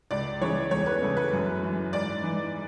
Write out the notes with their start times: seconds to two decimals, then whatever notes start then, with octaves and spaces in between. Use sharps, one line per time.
0.11 C#2 D5
0.41 C#3 E3 C#5
0.71 E2 C#5
0.86 B4
1.02 C#3 E3 A4
1.17 B4
1.32 F#2
1.63 E3
1.93 G#2 D5
2.24 E3